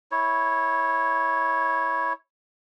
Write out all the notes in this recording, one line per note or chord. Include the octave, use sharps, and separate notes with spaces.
E4 C#5